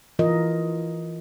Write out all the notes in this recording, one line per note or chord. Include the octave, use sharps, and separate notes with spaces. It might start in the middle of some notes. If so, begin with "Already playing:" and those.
E3 F4 A#4 D#5